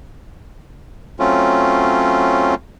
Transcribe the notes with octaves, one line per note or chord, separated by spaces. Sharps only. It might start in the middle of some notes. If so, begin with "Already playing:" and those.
F#3 A3 C4 C#4 F4